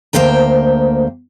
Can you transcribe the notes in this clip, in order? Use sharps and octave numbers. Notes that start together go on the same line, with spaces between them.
D2 A#3 C5 G5 A#5